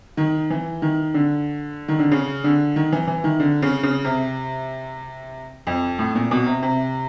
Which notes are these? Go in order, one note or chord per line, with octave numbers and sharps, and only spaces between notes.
D#3
E3
D#3
D3
D#3
D3
C#3
D3
D#3
E3
E3
D#3
D3
C#3
C#3
C3
F2
A2
A#2
B2
C3
C3